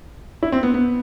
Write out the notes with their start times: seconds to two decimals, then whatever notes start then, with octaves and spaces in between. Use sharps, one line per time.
0.43 E4
0.52 C4
0.63 B3
0.74 B3